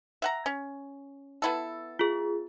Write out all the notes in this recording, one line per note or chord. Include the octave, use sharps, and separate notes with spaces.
E5 F#5 A#5
C#4
B3 E4 A4
F4 G#4